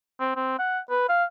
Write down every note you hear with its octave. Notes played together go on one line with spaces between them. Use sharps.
C4
C4
F#5
B4
F5